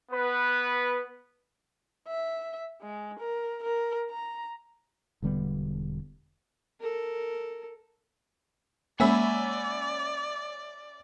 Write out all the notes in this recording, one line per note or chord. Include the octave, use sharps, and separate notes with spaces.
B3 B4
E5
G#3
A#4
A#4
A#5
E1 D3 G3 B3
A4 A#4
G#3 A#3 C#4 D5 E5 F#5 G#5 B5